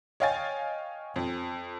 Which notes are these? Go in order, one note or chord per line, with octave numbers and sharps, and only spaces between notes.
C#5 D#5 F5 G5 G#5 A6
F2